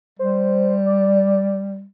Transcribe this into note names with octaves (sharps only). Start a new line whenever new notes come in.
G3 C5
D5